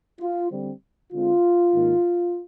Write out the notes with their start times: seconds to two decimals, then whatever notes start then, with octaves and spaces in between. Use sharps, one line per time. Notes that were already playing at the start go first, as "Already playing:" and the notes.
0.20 F4
0.50 D3 G3 C4
1.12 D3 G#3 C4 F4
1.74 G#2 D#3 A#3